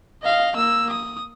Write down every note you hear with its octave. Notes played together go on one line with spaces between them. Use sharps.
D#5 F5
A#3 E6
D#6